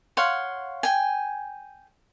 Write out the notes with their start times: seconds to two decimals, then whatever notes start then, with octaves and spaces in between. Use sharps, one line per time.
0.17 C#5 F5 F#5 C6
0.83 G5 G#5